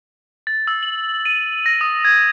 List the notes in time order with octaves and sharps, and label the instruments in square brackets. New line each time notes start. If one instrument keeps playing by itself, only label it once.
[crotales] A6
E6
F#7
D#7
A#6
D#6
G#6